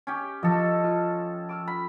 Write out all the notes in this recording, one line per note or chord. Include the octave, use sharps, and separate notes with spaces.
C#4 G4
F3 A4 D#5
F4
D6 E6 F6
B5